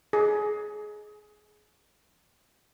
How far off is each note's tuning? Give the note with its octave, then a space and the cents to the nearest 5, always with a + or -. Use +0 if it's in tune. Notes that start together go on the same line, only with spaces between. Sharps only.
G#4 +20